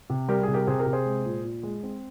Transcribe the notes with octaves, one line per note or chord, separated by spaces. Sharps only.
C3
G3 G4 A#4
C3 G#4
G4 A#4
C3 G#4 C5
G4 A#4
C3
G#4 C5
G#3
A#2
A#2
G#3
C4